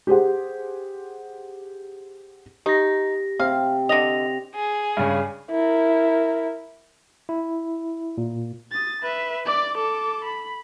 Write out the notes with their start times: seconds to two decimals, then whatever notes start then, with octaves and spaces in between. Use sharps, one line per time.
0.07 G4 G#4 C5 F#5
2.66 D#4 G4 A#6
3.40 C3 F5
3.89 D3 D#5 A#6 F7
4.55 G#4
4.97 G2 C#3
5.51 E4 A#4
7.29 E4
8.18 A#2
8.72 D#6 A6
9.02 B4 E5
9.46 D5 D6
9.78 A4 D6
10.25 B5